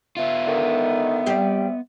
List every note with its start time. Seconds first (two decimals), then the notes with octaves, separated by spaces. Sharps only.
0.17 B3 F4 E5
0.47 D3 D#3
1.26 G3 C4 G4